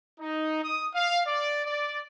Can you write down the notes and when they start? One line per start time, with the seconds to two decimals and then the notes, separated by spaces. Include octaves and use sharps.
0.21 D#4
0.64 D#6
0.94 F5
1.27 D5
1.66 D5